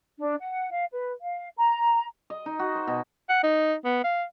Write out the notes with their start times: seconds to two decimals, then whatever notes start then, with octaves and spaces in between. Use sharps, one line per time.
0.19 D4
0.40 F#5
0.71 F5
0.92 B4
1.22 F5
1.58 A#5
2.30 D#5
2.46 D#4
2.59 F#4
2.75 C5
2.87 B2
3.30 F#5
3.44 D#4
3.85 B3
4.04 F5